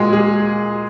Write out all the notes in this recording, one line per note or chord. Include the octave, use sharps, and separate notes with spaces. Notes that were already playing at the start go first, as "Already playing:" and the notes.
Already playing: A#2 G#3 F#4 G#4
G#4